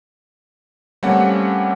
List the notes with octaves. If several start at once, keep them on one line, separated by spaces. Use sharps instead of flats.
G3 A3 A#3 C4 C#4 F#5